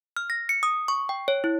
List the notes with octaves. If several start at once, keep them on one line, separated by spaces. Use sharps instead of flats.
F6
A#6
C#7
D#6
C#6
G5
C#5
E4